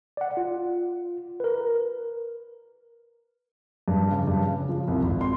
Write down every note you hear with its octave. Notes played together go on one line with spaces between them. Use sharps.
D5 F#5
F4
A#4 B4
G2
C#3
G2
C#3
F3
C2
G#1
C6